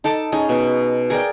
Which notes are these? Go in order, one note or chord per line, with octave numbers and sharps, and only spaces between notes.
D#4 A4 A5 D6
C#4 D#4 G#4
B2
G#4 A#4 D5 G5